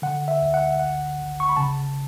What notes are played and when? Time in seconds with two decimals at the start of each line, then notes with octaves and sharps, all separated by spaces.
0.02 D3 F#5
0.28 E5
0.41 D2
0.54 F#5
0.80 G#1 F#5
1.18 G#1
1.40 C#6
1.49 B5
1.57 C#3 A5